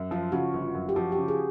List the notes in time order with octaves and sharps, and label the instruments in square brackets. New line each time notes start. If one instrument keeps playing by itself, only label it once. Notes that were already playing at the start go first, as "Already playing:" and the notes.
Already playing: [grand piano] F#2
[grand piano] F3 [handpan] F4
[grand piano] C#3 [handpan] F#4
[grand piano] G1
F#2
[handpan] G4
[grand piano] F3 [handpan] F#4
[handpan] G4
[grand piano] C#3
[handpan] G#4